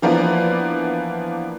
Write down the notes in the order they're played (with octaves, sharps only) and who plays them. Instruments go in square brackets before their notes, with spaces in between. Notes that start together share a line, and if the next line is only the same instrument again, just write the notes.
[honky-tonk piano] E3 F3 A#3 B3 D4